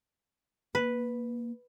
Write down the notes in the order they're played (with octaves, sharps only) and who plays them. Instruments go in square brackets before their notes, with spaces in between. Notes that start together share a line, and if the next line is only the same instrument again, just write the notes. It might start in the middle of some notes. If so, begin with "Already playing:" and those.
[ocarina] A#3 [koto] B4